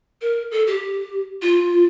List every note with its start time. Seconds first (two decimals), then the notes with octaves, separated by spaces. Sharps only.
0.21 A#4
0.51 A4
0.67 G4
1.42 F4